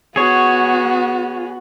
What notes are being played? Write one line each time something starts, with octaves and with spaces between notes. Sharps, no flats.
B3 F#4 G#4 C#5